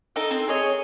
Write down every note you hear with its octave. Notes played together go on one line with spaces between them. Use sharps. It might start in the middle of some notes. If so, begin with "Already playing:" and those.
D#4 A4 G5
C4
G#4 C#5 D#5